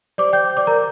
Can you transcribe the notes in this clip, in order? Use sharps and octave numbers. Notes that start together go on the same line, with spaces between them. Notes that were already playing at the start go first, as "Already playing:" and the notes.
G4 C5 D5 D6
G5 G6
D5 D6
A#4 A#5